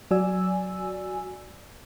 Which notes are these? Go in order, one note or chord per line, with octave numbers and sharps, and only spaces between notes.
F#3 F#4 D5 G#5 E6